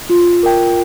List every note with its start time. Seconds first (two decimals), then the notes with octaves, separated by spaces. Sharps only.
0.10 F4
0.43 A#4 G5